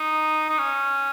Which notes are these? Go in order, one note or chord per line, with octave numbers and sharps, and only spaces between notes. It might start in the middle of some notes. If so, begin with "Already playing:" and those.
Already playing: D#4
D#4
C#4